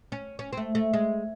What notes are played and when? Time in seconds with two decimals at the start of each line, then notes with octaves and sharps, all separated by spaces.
0.12 C#4
0.39 C#4
0.53 C4
0.57 A3
0.75 A3
0.93 G#3